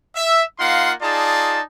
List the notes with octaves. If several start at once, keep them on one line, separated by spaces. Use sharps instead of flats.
E5
A#3 D#4 F4 F5 F#5 C6
D#4 F4 G#4 D5 A5